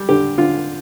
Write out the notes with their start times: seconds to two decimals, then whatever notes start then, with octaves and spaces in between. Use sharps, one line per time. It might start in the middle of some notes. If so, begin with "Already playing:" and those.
Already playing: G3
0.09 D3 G4
0.38 D3 F4